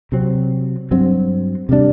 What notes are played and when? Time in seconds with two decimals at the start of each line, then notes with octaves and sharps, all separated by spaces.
0.12 C3 F#3 C4
0.91 G2 F#3 C4
1.69 C3 G3 D4